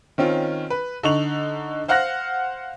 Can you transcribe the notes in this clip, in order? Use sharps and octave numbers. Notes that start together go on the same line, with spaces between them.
D#3 C4 C#4 F4
B4
D3 D#4 C#6 F7 F#7
C5 F5 F#5 F6 F#6 A#6